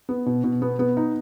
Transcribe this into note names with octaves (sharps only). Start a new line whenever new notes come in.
B3
B2
B2
B3
B3
D#4